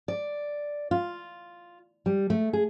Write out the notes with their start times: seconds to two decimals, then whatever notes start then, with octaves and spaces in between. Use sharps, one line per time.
0.08 D5
0.91 F4
2.06 G3
2.30 A3
2.53 G#4